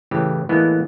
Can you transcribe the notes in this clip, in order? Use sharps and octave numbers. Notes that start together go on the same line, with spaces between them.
A2 C#3 E3 G4
A2 E3 G#3 A#3 B3 E4